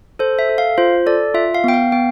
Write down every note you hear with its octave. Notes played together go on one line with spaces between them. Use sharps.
A4 C5
E5
A4
F5
F4 C5
A4 D5
F4 E5
F5
B3 G5
F5
B3 G5